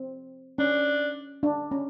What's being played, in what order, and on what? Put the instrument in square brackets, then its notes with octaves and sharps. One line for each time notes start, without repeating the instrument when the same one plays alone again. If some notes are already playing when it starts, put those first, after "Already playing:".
Already playing: [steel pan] C4
[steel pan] C#4 [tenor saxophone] D4
[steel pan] D4
C#4